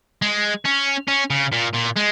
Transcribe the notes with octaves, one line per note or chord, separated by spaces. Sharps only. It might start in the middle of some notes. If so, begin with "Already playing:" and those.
G#3
C#4
C#4
C#3
A#2
A#2
G#3